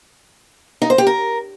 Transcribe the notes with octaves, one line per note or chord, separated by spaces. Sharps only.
D#4
C5
G4
A#4